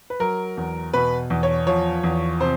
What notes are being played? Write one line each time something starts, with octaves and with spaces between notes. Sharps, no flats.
B4
F#3 A#4
E2
B2 B4
E2
C#5
F3 C#5
E2
C3 C5